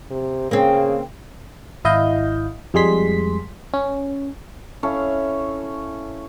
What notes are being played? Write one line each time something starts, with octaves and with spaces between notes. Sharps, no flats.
C3
C#3 A#3 C4
G#1 E4 D#5 F5 G6
F2 G3 G#3 G#4 C6 B6
C#4
C#4 E4 A4 F5